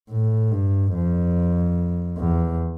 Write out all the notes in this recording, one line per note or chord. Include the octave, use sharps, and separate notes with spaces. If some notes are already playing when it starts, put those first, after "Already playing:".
A2
G2
F2
E2